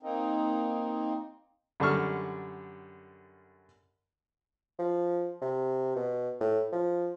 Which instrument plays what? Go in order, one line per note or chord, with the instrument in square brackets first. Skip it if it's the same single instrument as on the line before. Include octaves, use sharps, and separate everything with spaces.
[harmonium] A#3 C4 D#4
[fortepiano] F#2 D3 G3 A5 C#6 F6
[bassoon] F3
C3
B2
A2
F3